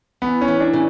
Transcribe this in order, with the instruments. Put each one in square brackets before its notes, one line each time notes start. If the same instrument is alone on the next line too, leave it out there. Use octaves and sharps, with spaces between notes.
[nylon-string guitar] E2 [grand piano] B3
[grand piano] C#4
[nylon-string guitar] E3
[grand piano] D4
[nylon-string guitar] C#3